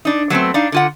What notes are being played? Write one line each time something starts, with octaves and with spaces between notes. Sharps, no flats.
D4 D#4
F#3 A3 B3 C4
D4 D#4 F5
D3 F4 F#5